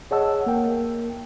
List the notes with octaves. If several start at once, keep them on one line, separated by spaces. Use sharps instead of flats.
G#4 C#5 D#5 F#5 A5 E6
A#3 A#4 G5